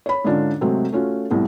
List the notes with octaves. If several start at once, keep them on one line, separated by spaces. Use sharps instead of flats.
C#5 B5
G#2 D3 C#4 D4 F4
C3 F#3 G#3 A3 C4
A3 C#4 F4 F#4
C2 A2 B3